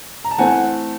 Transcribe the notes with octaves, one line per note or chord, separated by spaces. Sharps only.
A#5
A5
E3 A3 C4 F#5 G#5